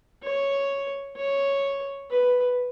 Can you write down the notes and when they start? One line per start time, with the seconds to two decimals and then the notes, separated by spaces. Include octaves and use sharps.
0.24 C#5
1.17 C#5
2.10 B4